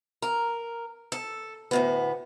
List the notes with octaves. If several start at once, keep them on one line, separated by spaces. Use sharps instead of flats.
A#4
A4
D2 A2 B3